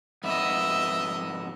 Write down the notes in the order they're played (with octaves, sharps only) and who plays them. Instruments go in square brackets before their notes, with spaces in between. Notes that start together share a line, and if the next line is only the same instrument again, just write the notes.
[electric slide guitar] F2 G#2 B3 [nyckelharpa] D#5 E5